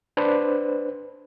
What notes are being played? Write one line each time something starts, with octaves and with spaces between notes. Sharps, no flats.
D4 B4 C5